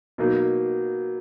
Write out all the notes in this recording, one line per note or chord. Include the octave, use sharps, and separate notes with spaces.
B2 F#3 A#3 D#4